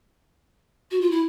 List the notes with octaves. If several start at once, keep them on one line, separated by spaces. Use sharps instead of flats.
F#4
F4
E4